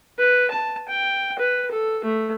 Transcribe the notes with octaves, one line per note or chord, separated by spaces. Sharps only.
B4
A5
G5
B4
A4
A3